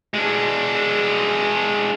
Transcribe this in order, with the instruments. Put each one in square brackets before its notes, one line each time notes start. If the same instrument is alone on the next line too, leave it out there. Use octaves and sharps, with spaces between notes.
[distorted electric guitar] G#3 D4